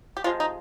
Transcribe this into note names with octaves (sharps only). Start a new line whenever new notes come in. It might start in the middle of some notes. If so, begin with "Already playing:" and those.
G4
C3 F3 G#3 F4
D#4